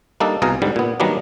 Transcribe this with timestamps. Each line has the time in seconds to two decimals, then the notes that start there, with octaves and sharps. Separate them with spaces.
0.20 G3 A#3 D4 D#4 A4
0.42 C2 B2 G#4 F5 A#5
0.62 G#2 D3 G3
0.76 A#2 B3
1.00 D#3 F#3 G3 A#3 B3 D4